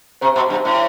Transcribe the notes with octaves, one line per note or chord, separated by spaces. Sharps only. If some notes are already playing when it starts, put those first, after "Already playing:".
C3 C5
B2
G2
A2